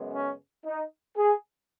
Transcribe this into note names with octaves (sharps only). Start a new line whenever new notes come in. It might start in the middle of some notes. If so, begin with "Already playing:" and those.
Already playing: F#2 C#3 G#3 B3
C#4
D#4
G#4